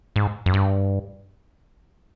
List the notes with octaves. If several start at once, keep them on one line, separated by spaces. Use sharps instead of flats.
G#2
F#2
G2